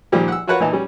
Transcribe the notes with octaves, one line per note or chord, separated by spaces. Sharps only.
A#2 D#3 F3 G3 G4
F#5 E6
F4 F#4 A#4 B4 C#5 F#5
A#2 E3 D#4 A5
G3 C#4